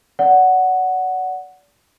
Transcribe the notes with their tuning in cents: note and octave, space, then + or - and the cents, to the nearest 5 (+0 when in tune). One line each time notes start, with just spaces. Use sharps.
D5 -35 F#5 +0